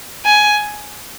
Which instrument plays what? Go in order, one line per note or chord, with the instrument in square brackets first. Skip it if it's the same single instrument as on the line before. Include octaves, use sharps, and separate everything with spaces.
[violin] G#5